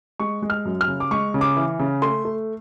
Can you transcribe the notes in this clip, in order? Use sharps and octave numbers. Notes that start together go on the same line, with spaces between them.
G#3 C#6
G#3
F6
F#2
F6
C#3
D6
G#3 C#6
C#3
D6
E3
C#3
A3 C6
A3